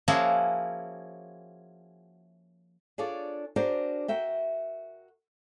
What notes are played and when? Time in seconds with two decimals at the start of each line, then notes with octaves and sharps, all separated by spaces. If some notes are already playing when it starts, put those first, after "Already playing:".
0.08 F3 A#3 C#4 E4 F#4 G#4
2.98 D4 F4 G#4 A4 C#5 D5
3.56 D4 F#4 G#4 A#4 C5 D5
4.08 F#4 A#4 E5 G5